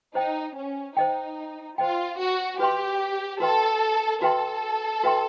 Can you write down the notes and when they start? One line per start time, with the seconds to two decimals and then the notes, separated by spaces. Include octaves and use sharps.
0.15 D#4 C5 D#5 G5
0.56 C#4
0.96 D#4 C5 D#5 G5
1.78 F4 C5 D#5 G5
2.18 F#4
2.59 F#4 G4 B4 E5 G5 C6
3.40 F#4 A4 B4 E5 G5 C6
4.22 F#4 A4 B4 E5 G5 C6
5.03 F#4 B4 E5 G5 C6